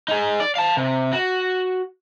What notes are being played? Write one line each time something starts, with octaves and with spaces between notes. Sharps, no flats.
D#4 G#4
D5
F5 A5
C3
F#4